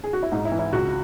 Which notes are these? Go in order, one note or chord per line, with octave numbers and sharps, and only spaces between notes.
G#4
F#4
E4
G#2 D#4
E4
E3
E4
C#2 F#4